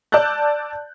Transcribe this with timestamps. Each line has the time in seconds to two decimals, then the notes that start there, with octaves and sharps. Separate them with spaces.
0.12 D5 A5 E6 F#6 G6